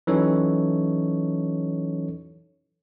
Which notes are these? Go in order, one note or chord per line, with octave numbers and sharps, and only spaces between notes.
E3 F#3 C#4 D#4 A4 C#5